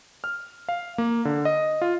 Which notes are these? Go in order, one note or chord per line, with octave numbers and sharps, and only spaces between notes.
F6
F5
A#3
D3
D#5
F4